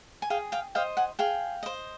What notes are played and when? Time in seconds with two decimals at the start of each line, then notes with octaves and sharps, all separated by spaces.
0.22 G#5
0.30 G#4 F5 G5
0.52 F5 G5
0.75 C5 D#5 F5 G5
0.97 F#5 G#5
1.19 G#4 F5 G5
1.63 C5 D#5